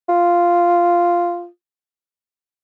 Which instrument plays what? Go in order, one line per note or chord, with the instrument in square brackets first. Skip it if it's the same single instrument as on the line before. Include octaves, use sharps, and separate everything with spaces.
[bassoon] F4